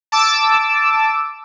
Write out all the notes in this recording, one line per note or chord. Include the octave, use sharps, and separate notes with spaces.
A5 D6 E6